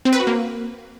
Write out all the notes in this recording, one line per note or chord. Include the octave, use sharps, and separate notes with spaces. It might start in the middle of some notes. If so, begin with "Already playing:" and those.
C4
B4
F#4
A#3